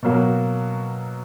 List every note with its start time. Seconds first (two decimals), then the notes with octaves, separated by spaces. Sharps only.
0.03 B2 F#3 A#3